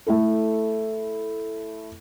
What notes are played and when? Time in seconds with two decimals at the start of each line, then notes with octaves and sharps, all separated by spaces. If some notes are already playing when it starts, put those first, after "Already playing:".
0.07 A3 E4 A4